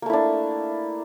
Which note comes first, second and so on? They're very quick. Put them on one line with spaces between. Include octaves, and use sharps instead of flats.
A#3 A3 E4 D4